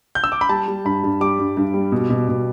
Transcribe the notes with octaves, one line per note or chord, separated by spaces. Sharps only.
G6
E6
D6
B5
G3 A5
G3
G2 B5
G2
G3 D6
G2
G2
G3
B2
B2
B2